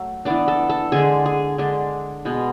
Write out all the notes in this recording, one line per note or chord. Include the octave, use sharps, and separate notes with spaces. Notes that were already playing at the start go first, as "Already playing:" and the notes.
Already playing: F#3 A3
E3 B3 D4 D5
A4
A4
D3 G#3 D4 G#4
G#4
D3 G#3 D4
B2 G#3 B3